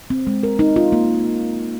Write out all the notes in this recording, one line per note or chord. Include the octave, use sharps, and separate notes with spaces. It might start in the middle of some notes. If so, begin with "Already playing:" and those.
C4
G#3
A#4
D#4
F4
A#3